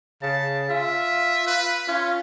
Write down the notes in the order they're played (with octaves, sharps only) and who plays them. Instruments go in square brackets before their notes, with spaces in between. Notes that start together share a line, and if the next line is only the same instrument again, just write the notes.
[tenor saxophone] C#3 [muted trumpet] A5
[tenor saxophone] F4 [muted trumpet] E5
[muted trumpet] B4
[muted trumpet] C#4 [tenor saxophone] F4